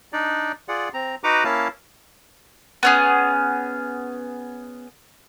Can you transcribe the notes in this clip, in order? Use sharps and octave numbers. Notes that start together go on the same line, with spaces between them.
D4 D#4 D5
F4 G#4 D5 F#5
C4 A#5
D#4 F#4 B4 F#5 A#5 D6
A#3 C#4 E4 F5 A5
B3 C#4 G#4